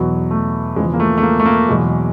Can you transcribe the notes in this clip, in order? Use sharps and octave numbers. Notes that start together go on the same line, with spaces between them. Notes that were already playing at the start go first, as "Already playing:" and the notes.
Already playing: E2 B2 F#3
A3
E2 C#3 F3 G#3
A#3
A3
A3
A#3
A3
A#3
E2 B2 F#3 G#3